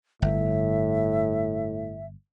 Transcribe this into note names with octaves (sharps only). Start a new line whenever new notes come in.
G1 A2 E5